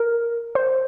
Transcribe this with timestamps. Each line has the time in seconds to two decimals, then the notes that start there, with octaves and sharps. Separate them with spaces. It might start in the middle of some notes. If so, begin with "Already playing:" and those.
Already playing: A#4
0.55 C5